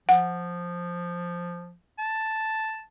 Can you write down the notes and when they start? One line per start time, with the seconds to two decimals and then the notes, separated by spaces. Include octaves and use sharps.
0.09 F3 F#5
1.98 A5